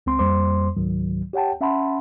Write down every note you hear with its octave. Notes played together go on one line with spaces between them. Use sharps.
C#2 C4 C6
F2 G3 A#3 C5 C6 D6
C#2 G#2 D#3 F#3
G4 C#5 F#5 G5 A5
C#4 E5 F#5 A5 B5 C6